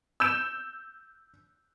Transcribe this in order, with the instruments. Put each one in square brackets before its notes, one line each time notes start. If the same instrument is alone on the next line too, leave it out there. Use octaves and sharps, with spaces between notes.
[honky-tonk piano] E6 G6 E7